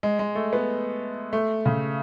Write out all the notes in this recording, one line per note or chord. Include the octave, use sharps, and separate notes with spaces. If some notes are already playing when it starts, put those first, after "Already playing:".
G#3
G#3
A3
B3
A3
C#3